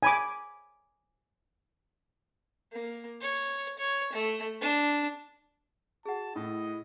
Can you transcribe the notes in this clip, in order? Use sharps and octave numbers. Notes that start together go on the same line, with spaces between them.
G#5 B5 D6
A#3
C#5
C#5
A3
D4
F#4 G#4 F#5 A5
A2 E4 D#5